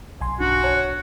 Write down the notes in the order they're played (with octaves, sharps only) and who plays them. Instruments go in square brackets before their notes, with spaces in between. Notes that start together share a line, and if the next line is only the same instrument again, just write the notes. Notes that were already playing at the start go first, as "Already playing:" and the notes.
[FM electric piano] B1 G#5 C6
[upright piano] G2 [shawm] F#4
[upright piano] C#5